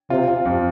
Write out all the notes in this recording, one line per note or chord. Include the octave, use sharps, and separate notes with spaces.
C3 F4
F4
F2